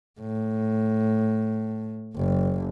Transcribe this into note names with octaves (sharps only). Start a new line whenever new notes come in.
A2
F#1